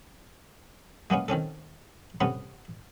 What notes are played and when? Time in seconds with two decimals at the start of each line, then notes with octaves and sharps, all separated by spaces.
1.10 G#3 A#3 B3 C#4
1.28 D#3 C4 C#4 A4
2.21 G2 C3 A3 B3 C#4